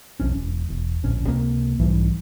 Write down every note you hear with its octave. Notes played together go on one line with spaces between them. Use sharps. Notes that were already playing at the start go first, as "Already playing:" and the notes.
B1 F2 C#4
E1
E1
D1 A#1 C#4
C#2 C3 A#3
B1 G#2 E3 G3